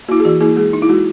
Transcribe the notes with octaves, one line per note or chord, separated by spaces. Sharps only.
A#3 E4 F#4
G#4
E3 F#4
A#3 E4 G#4
G#3 G#4
D#4
E4
G#3 F#4